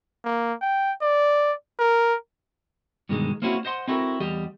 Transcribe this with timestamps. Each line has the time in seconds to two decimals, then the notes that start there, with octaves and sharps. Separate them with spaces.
0.25 A#3
0.61 G5
1.02 D5
1.79 A#4
3.09 G2 B2 D3 D#3 G#3
3.42 A#3 C4 C#4 E4 F#4
3.65 C5 D#5 F#5 C6
3.88 C4 E4 F#4 A4 A#4
4.20 E2 G3 G4 D#5